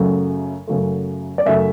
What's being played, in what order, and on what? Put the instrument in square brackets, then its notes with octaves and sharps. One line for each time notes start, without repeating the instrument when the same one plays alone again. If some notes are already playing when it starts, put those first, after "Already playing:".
Already playing: [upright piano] F#2 C#3 F#3 A3
F#2 C#3 F#3 A3
D5
F#2 C#3 F#3 A3 E5